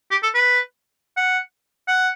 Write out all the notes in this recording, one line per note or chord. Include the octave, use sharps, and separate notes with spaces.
G4
A4
B4
F#5
F#5